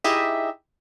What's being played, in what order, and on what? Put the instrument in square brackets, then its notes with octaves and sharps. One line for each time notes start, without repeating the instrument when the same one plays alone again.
[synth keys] D#4 E4 G4 G#4 D#5 E5